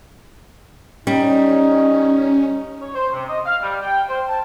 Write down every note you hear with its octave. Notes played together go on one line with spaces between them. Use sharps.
G3 C#4 D#4
C#5
C5
C3
D#5
F5
G3
G5
C5
A5